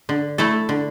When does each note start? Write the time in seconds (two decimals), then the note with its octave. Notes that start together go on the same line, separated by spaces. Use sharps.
0.09 D3
0.38 A3 E4 A4
0.69 D3